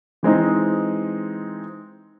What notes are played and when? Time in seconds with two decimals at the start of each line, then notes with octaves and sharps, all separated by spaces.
0.23 E3 G#3 C4 D#4